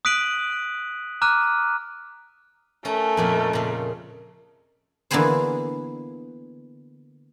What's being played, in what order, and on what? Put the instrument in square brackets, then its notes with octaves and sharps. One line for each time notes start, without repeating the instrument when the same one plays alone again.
[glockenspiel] D#6 F#6 B6 D7 D#7 F#7
A#5 D6 F6 F#6 D#7
[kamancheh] A3 A#4 [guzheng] C#4 A#5
[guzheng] F2 A#2 D#5
A#2 C#3
D3 E3 A#3 B3 G#4 C5